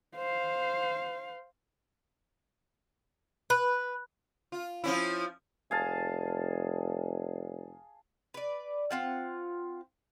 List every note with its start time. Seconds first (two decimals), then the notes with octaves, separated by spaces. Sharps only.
0.16 C5 F5
3.50 B4
4.52 F4
4.84 F3 C#4 E4
5.71 F1 G#4 F5 A5
8.34 B4 D5
8.91 C4 F4 F#5